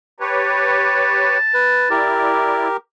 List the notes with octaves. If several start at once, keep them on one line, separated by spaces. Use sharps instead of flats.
G4 B4 C#5 A5
B4
E4 G4 A#4 D5